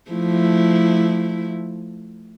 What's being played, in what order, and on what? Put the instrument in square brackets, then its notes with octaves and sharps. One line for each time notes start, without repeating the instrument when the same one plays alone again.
[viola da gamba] F3 A3 E4